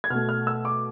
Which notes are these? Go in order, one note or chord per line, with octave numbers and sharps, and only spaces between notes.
G#6
B2 A3 F6
F6
E6
D6